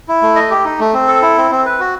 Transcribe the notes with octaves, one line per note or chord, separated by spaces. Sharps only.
E4
A3
D#5
G4
D#4
A3
C4
A4
E4
C4
C4
B4
F#4